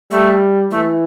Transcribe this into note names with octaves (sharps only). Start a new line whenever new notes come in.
G3 A3
E3 A3